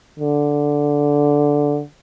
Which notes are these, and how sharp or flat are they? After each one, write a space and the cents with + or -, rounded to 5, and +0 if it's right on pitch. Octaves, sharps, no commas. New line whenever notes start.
D3 -5